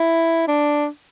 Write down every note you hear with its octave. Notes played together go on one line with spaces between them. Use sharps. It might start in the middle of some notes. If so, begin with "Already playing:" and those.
Already playing: E4
D4